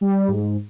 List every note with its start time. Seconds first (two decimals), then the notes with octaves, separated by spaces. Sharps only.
0.01 G3
0.28 G#2